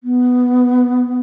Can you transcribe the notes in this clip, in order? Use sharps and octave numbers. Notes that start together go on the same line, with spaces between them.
B3